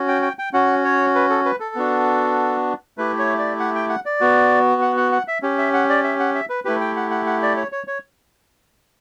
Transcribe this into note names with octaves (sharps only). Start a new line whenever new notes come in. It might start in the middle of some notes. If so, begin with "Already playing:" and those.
Already playing: C#4 F#4
G5
G5
G5
C#4 F#4 F#5
C#5
B4
A4
B4
A4
B3 D4 F#4
A3 E4 G4 B4
C#5
D5
F#5
G5
F#5
D5
B3 F#4
F#5
F#5
F#5
E5
C#4 G4
E5
F#5
D5
E5
F#5
E5
B4
A3 E4 G4 B4
G5
F#5
F#5
F#5
D5
C#5
C#5
C#5